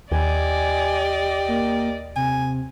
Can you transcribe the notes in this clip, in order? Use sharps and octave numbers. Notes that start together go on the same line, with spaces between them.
D#2 G4 D5 D#5 G#5
A#3
C3 G#5